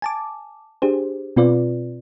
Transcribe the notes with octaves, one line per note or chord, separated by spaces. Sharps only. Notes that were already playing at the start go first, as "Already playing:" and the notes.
G#5 A5 D6
D4 G4 G#4 C5
B2 C4 F4 B4 D5